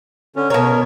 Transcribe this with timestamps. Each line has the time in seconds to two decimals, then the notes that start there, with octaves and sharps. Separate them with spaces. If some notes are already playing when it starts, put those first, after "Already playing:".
0.36 D3 C#4
0.50 B2 A#4 C#5